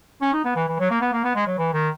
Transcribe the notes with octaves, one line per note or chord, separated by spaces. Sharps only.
C#4
D#4
B3
E3
E3
F#3
A#3
B3
A#3
B3
G#3
F#3
E3
D#3